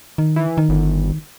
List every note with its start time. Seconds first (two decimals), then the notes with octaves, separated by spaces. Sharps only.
0.18 D#3
0.36 E3
0.58 D#3
0.69 G1